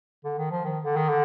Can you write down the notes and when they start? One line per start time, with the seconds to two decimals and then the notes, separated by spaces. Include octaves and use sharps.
0.25 D3
0.38 D#3
0.51 F3
0.65 D#3
0.84 D3
0.96 D#3
1.09 D3